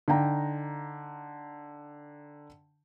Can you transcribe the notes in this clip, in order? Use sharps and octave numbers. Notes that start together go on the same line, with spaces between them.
D3 D#4 F5 G5 A#5